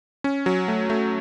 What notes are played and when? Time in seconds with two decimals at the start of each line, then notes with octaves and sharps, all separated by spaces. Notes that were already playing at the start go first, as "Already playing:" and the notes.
0.24 C#4
0.46 F#3
0.68 A3
0.90 A3